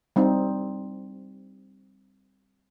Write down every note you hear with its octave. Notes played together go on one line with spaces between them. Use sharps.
G3 C4 D#4